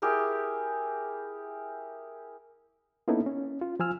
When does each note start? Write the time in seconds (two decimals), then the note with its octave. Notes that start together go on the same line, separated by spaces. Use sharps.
0.02 E4 G4 G#4 A#4
3.08 A#3 B3 C#4 D#4 E4 A4
3.27 C#4
3.61 F4
3.80 F3 F4 G#5 E6 F6